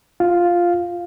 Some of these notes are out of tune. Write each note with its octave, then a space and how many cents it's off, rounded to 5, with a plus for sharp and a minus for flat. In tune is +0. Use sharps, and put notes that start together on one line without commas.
F4 +0 F5 +0